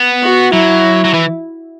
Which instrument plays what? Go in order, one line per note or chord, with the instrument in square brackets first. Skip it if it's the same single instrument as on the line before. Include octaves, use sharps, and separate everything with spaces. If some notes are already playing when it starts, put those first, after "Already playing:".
Already playing: [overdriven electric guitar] B3
[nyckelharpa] F#4
[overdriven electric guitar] F#3 [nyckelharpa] E4
[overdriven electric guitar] F#3
E3